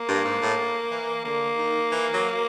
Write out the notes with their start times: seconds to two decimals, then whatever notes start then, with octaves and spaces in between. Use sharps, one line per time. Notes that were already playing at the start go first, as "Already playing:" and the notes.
Already playing: A#3
0.08 G2
0.25 G#2
0.41 A2
0.91 E3
1.24 D3 A#3
1.57 D#3
1.91 E3
2.13 F#3